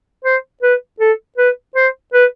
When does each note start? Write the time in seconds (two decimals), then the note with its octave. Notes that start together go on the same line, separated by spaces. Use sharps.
0.24 C5
0.63 B4
1.00 A4
1.38 B4
1.76 C5
2.13 B4